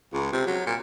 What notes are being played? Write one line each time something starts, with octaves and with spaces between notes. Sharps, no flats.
C#2
C3
F#3
A#2